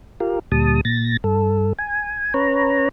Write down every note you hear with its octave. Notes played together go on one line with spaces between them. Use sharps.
F4 G4 A#4
D2 A#2 G3 A5 D#6
A#2 A6 A#6
G2 A4
G#5
C#4 B4 C#5 A#5